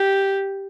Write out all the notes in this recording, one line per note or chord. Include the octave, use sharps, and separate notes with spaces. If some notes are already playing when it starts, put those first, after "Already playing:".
Already playing: G4